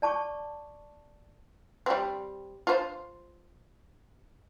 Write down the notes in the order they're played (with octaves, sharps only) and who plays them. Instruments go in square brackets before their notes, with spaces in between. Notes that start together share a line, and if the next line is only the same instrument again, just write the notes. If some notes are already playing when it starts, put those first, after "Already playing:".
[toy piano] D5 A5 C#6 D6
[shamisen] G3 C4
F4 C5